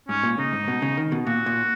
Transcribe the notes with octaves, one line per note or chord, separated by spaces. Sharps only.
G#2 C#4
A#2
C#3 D#4
G#2
B2
C#3
D#3
B2
A#2 F#4
A#2